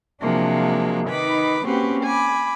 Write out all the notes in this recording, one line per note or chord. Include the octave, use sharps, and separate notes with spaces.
C3 F3 F#3 G#3 A#3 D4
D#3 D#4 B4 B5 D6
A#3 C4 C#4 F#4 G4 B4
G#5 B5 D6